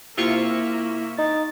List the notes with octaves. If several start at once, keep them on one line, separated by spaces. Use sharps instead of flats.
C3 A#3 E4 F4 E5 C#6
D#4 A6